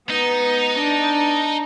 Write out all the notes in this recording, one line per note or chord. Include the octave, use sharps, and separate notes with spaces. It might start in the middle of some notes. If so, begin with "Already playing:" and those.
B3 D#4
D4